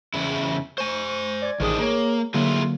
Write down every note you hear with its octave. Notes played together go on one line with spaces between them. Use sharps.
E2 C#3 E4
C5 G#5 C#6
D5 G#6
A1 D#3 F3 D4 G#4 D#6
A#3 G#4 C#5
D3 F#3 A#3 E4 F4 G#4